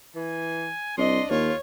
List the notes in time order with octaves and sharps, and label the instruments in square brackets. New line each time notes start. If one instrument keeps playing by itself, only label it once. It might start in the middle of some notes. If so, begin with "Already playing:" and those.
[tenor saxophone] E3 [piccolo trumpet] G#5
[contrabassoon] C2 [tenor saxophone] D4 [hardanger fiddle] D#5 [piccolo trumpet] C6
[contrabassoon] D#2 [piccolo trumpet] F4 [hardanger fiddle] C#5